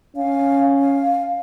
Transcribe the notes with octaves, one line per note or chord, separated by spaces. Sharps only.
C#4 F5
F5